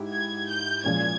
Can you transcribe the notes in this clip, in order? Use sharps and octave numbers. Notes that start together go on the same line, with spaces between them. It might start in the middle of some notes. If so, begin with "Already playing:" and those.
Already playing: G#2 E4 G4
G#6
G6
A#2 F3 G#3 C#4 G#6